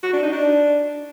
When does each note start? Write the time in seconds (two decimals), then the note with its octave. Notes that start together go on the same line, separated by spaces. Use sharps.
0.03 F#4
0.13 D4
0.23 D#4
0.33 D4